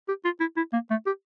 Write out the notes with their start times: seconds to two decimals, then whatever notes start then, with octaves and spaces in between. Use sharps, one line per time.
0.08 G4
0.25 F4
0.40 E4
0.57 E4
0.73 A#3
0.91 A3
1.06 G4